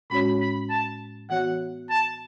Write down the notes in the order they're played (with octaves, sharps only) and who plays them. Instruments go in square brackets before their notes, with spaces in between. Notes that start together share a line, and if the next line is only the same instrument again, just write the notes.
[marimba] A2 G#3 C#4 F#4 C#5 [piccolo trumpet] B5
[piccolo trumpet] B5
A5
[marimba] E3 B3 F#4 C#5 [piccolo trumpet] F#5
[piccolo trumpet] A5